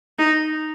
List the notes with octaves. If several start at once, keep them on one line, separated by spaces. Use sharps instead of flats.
D#4